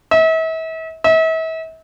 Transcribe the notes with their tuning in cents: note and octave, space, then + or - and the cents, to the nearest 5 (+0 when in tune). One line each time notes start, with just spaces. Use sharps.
E5 -40
E5 -40